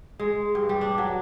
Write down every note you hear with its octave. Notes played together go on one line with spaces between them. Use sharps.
G#3
G2
G3
D4
F#3